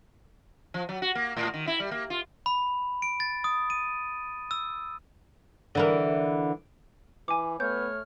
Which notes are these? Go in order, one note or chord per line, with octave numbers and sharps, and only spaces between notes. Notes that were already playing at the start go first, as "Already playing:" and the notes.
F3
F#3
F#4
A#3
A2
D#3
E4
G3
A#3
F4
B5
D7
A6
D#6
D#7
E6
D3 E3 A#4
E3 G#5 D6
A3 B3 C#5 F6 G6